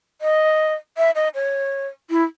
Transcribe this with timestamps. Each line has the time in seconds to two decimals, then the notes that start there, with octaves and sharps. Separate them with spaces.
0.21 D#5
0.98 E5
1.15 D#5
1.35 C#5
2.10 E4